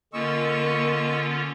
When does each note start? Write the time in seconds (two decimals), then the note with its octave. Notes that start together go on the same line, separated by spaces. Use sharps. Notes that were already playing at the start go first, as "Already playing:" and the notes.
0.13 D3 A#3 C#4 F4 D#5 C#6 E6